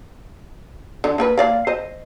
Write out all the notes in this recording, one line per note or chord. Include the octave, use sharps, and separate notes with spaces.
D3
A#3 A#4 B4
A#3 D5 F5
C5 D#5